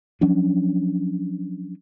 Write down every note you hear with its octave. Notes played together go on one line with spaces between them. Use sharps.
F3 F#3 C#4 D4